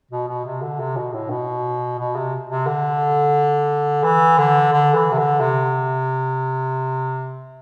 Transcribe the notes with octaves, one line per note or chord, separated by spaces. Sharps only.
B2
B2
C3
D3
C3
B2
A2
B2
B2
C3
C3
D3
E3
D3
D3
E3
C3
D3
C3